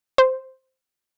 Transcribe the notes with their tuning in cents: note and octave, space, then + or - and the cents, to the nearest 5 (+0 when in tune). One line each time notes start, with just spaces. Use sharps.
C5 +0